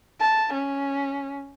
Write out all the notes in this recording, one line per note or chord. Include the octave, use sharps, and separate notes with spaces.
A5
C#4